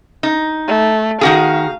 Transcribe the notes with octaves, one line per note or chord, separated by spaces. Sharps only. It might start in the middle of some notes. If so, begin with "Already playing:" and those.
D#4
A3
D#3 F#4 G#4 F5